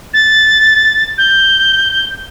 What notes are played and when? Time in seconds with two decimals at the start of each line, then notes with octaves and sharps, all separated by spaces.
0.14 A6
1.18 G6